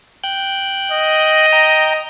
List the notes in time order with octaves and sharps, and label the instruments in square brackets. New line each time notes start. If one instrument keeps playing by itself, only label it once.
[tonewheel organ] G5 F#6 G6
[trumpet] D#5
[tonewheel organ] G5 A#5 G6